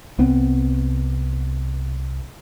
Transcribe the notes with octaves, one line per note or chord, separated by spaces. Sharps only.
C2 B3 C4